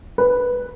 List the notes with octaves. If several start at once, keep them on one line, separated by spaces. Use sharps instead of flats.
B4